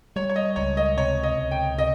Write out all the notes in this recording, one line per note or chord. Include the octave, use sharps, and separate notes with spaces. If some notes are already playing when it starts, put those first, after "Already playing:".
G3 C#5
C#5
D#5
C#2 C#5
D#5
C3 C#5
D#5
C#2
G5
C3 D#5